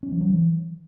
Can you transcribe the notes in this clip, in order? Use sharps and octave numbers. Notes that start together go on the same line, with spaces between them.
C#4
F3
F#3
E3